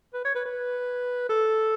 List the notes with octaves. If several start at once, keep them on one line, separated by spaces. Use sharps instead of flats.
B4
C#5
B4
B4
A4